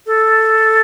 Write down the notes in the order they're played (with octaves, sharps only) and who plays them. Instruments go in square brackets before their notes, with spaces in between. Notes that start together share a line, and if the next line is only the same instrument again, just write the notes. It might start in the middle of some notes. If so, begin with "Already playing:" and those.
[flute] A4